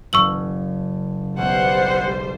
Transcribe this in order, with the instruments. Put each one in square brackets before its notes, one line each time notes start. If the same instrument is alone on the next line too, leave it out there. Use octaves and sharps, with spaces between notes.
[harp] F#1 C#3 [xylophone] C#6 E6 F#7
[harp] B1 [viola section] G3 C5 [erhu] F#5